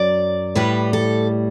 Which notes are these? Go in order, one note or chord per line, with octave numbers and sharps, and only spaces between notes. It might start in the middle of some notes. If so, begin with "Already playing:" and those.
Already playing: F#2 F#3 D5
A2 G3 B4
A4